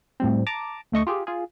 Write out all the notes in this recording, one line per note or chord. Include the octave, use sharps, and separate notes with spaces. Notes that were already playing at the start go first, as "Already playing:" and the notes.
A2 G3 C4
A5 A#5 D6
D2 A3 D#5 C#6
F4 G4 G#4
F4 G#4